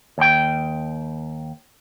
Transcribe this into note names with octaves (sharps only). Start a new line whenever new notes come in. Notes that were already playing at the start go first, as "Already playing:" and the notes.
D#2 G5